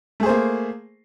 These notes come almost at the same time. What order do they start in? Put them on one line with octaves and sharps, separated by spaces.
A3 G#4 C5 A#3